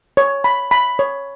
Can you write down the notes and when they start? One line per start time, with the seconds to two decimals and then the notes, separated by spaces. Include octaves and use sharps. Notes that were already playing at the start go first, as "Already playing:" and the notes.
0.17 C#5
0.44 B5
0.71 B5
0.99 C#5